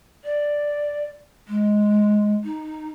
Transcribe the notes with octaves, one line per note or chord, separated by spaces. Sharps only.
D5
G#3
D#4